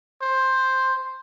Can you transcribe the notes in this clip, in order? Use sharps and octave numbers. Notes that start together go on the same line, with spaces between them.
C5